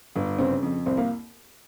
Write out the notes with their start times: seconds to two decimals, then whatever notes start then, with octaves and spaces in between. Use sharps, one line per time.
0.16 G1
0.39 C#3 C4
0.62 F2
0.86 C2 C4
0.97 A#3